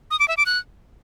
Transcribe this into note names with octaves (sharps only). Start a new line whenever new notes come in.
D#6
D6
E5
D6
F#6